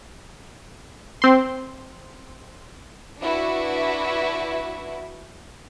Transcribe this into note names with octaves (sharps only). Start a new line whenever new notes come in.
C4 C6
D4 E4 F#4 B4 E5